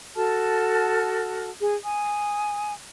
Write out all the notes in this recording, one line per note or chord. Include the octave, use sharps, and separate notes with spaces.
F#4 A4 A5 F6
G#4
G#5 D#6